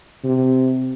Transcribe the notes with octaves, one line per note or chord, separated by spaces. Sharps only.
C3